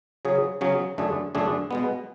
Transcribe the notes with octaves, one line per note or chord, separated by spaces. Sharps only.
C#3 F#3 C#4 G#4
C#3 F#3 C#4 G#4
F#2 D3 A3 D4 G#4
F#2 D3 A3 D4 G#4
B2 G#3 B3